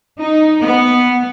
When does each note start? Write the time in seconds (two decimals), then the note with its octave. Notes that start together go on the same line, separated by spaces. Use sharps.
0.20 D#4
0.63 B3